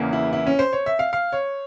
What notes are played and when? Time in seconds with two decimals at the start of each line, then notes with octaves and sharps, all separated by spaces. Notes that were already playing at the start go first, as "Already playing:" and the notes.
Already playing: E2 C#3 E3 A#3
0.13 E4
0.33 E4
0.47 C#4
0.59 C5
0.73 C#5
0.86 E5
0.99 F5
1.13 F5
1.33 C#5